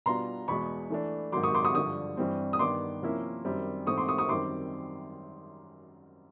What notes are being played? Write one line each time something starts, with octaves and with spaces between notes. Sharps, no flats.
B2 G3 B3 D4 F4 A#5 C6
E2 B2 G#3 B5 C#6
E3 A3 D4
G#2 D#3 F#3 C6 D6
C#6 D#6
C6 D6
C#6 D#6
G2 D3 F3 C#6 D#6
G2 E3 G3 C4
D#6
G2 D#3 G3 B3 C6 D6
C3 F3 A#3 C#4 E4
F#2 D#3 G3 C4
G#2 E3 A3 C4 E4 C#6 D#6
C6 D6
C#6 D#6
C#6 D#6
F#2 D#3 G3 C4 C6 D6